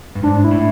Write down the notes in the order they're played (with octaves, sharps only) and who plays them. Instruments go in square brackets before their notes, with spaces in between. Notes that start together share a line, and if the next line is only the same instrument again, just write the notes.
[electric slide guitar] G2
[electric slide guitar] G#2 [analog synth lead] D4
[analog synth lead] E4
[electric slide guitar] A2